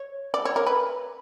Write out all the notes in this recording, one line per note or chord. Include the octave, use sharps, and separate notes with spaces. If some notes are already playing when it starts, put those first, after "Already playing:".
Already playing: C#5
D5
C#5
A#4
B4